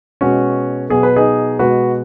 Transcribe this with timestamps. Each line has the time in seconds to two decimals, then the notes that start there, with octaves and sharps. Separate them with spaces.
0.21 B2 G#3 B3 C#4 F#4
0.90 B2 F#3 B3 G#4
1.03 B4
1.16 D#4 G#4
1.59 B2 G#3 B3 F#4 B4